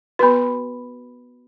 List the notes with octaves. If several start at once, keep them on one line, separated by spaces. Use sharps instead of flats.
B3 F#4 B4 B5